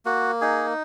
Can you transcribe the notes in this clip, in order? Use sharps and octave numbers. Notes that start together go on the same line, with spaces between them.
A#3 F#4
D#4 G#4